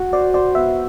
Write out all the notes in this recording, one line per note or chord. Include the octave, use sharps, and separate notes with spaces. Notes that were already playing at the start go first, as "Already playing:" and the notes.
Already playing: F#4
C5 D5
C5 D5
B3 E5